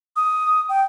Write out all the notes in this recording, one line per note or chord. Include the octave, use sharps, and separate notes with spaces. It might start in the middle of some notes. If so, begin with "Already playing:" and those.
D#6
G5